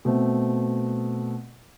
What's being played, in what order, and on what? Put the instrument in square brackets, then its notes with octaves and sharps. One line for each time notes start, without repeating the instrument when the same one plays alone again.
[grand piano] B2 A3 C4